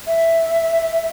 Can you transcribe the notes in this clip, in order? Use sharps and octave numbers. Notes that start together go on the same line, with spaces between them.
E5